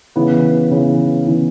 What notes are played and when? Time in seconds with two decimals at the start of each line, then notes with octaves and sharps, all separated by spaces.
0.16 C#3 E3 B3
0.71 C#3 E3 B3
1.26 C#3 E3 B3